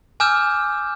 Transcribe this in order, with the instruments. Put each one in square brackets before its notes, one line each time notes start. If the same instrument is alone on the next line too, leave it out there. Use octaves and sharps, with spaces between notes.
[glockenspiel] G#5 D6 E6 F6 G6 E7